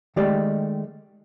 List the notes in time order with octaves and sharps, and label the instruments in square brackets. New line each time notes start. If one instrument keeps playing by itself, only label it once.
[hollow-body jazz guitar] D#3 G#3 A3 G4 D5